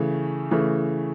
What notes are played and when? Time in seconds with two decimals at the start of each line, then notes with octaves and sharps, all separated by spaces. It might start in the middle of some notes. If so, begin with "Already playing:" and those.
Already playing: C#3 E3 A3
0.51 C#3 E3 A3